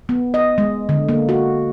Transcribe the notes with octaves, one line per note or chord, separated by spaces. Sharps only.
B3
D#5
G#3
D3
A#3
F#4